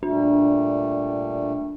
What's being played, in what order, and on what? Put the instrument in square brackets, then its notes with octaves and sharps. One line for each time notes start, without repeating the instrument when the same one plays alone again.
[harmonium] A#2 G3 A3 [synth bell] D4